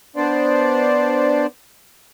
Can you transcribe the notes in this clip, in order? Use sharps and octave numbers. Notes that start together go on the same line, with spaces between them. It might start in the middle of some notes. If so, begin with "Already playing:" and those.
B3 D4 C5 D5